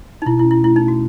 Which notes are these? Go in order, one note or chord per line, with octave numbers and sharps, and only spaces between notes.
D#4
B2 E4
E4
C#4
E4
A3 E4
D#4
E4
F#4